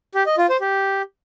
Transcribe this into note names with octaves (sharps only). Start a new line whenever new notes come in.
G4
D#5
F4
C5
G4